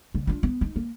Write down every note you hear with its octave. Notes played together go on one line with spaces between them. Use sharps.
C#3
D4 F4
B3
D#4
A#3